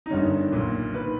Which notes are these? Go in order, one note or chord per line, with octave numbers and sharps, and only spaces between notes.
D#4
G1 G2 D#3 C#4
B1 A#2
D#3 B4